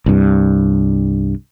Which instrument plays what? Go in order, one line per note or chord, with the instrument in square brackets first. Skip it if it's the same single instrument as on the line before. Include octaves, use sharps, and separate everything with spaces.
[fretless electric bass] C2 G2